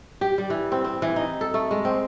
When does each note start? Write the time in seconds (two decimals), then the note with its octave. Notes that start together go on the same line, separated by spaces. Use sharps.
0.21 G4
0.38 G3
0.50 E3
0.72 C4
0.84 C4
1.02 E3
1.16 D#4
1.41 A4
1.54 A3
1.71 G#3
1.85 C4